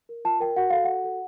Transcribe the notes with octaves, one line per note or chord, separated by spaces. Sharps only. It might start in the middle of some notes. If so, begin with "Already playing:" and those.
A#4
F4 A5
A#4 G5
F#4 F#5
A4 F5
F#4 F#5
A4